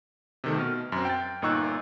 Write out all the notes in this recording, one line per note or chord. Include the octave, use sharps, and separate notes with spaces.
C3 D#3 A3
B2 F6
F#2 C4
G5 A6
G1 A#2 D#4 C#6 E6 F#6